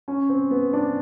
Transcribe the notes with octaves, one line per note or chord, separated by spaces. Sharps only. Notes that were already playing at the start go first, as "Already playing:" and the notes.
C#4
C4
B3
D4